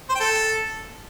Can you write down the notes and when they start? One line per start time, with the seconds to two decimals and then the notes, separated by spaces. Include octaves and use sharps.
0.09 C5
0.15 G5
0.20 A4